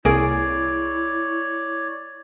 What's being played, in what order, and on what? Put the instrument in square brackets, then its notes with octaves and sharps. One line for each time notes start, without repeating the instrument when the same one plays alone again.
[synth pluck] C2 A#3 D7 [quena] E4 [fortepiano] G#4 [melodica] C#5 D5